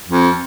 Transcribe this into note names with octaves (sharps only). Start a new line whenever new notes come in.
F2